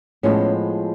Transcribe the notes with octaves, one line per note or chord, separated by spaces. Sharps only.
A2 F3 G#3 B3 C#4